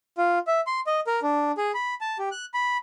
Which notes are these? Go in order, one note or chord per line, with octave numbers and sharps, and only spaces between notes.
F4
E5
C6
D#5
A#4
D4
G#4
B5
A5
G4
F#6
B5